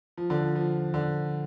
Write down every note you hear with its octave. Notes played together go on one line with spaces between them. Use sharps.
F3
D3
F3
F3
D3